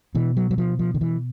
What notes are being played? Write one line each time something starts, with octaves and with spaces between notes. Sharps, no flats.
B2 E3
F#3
F#3
F3
F3
D#3
E3